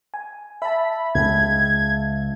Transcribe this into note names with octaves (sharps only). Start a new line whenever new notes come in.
G#5
E5 A5 B5
C#2 G#6